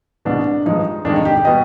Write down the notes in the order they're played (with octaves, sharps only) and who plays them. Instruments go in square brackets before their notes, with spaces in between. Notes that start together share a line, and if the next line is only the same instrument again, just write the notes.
[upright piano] C2 B2 G#3 D4
G2 F3 G#3 D#4
F2 D#3 G#3 D4
D#4
G4
G4
B2 G3 D#5